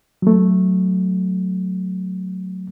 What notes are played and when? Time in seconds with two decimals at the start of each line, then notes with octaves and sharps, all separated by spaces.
0.22 F#3 A3